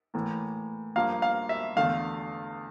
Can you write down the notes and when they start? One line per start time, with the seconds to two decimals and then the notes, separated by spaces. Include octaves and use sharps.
0.14 A2 E3 A#3
0.96 G2 F3 A#3 F5
1.22 F5
1.49 E5
1.76 E2 D3 A3 F5